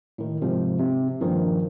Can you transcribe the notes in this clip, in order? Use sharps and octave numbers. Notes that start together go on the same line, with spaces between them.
A2 D#3
G#2 C3 F3
C3
A#1 G2 A#2 D#3 F3